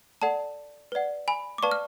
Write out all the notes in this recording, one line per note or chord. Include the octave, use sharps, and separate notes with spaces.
A4 D5 F#5 A5
B4 D5 F#5
G#5 B5
D6
B4 D5 F5 A5 C#6
F6